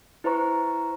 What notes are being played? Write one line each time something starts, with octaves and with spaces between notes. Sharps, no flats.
E4 B4 C5 A#5 C#6